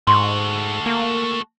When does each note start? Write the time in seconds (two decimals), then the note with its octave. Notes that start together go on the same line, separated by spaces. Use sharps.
0.07 G#2 A3 F#4 C6
0.86 A#3